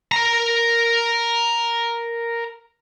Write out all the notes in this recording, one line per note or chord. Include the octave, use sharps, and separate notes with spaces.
A#4 A#5